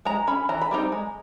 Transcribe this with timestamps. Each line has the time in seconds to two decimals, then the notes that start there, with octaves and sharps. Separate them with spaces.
0.05 G#3 A#5
0.27 C#4 B5
0.49 E3 A#5
0.62 B5
0.71 G3 C4 D#4 A#5
0.92 G#3